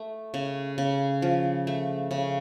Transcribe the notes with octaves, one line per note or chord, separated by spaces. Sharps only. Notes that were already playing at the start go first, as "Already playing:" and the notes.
Already playing: A3
C#3
C#3
F3
A3
C#3